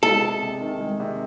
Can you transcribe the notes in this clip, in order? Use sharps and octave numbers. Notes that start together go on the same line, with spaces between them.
G#3 A4
C3
C3
D#3
G#3
C3